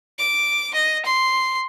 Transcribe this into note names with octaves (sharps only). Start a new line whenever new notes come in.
D6
D#5
C6